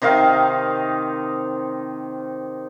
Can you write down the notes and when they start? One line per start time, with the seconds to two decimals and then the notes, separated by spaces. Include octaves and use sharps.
0.02 C3 D#3 D#4 F5